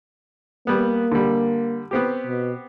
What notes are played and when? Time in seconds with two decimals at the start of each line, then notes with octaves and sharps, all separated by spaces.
0.67 G3 A#3 B3
1.11 D3 G3
1.91 B3 C4 G4
2.27 B2